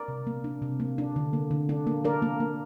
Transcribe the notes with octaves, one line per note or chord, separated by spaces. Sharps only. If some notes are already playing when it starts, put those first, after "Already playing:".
Already playing: A#4 D5
C3
A#3
D4
C3
A#3
D4
D3
A#3
D3
D4
A#3
D4 A#4 D5
A#3
A#3